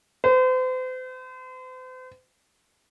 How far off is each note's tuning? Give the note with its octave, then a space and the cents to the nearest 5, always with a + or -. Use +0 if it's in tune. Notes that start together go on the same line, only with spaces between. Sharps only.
C5 -40